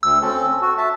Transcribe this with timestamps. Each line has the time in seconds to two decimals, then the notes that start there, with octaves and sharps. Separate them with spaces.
0.03 D2 E6
0.21 C4 C#4 A4
0.61 F#4
0.78 E5 A5